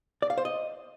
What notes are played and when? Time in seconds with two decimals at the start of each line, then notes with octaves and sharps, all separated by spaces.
0.22 D5
0.30 F5
0.38 C5
0.45 D#5